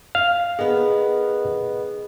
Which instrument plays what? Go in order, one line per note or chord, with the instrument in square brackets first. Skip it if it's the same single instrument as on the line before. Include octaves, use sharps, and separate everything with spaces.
[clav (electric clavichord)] F5
[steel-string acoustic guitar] D#3 B3 [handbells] G#4